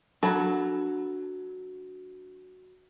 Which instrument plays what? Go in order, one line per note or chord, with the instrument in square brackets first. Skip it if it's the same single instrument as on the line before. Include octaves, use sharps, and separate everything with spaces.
[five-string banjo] F#3 A4 [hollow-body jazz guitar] D4 F#5 B5